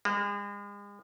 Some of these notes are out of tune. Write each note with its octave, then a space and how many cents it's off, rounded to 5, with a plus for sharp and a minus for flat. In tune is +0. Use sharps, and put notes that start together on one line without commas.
G#3 -40